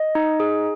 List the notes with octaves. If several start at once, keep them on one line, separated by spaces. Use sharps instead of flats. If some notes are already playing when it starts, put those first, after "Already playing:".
Already playing: D#5
D#4
G#4